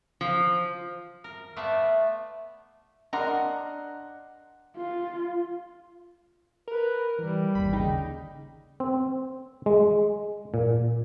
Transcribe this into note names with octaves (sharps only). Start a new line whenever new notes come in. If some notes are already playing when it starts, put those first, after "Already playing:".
F3
A#4
A3 B3 F4 B4 D5 E5
D4 A#4 D#5 F#5 A#5 C6
F4
A#4 B4
E3 G3
G#1 D#2 B5
C#3 D#4 G5
C4
G#3
A#2